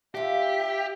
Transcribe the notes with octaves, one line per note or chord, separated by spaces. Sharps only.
D4 F4 G4 E5